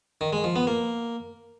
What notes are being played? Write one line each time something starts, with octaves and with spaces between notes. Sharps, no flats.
D#3
G#3
F3
B3
A#3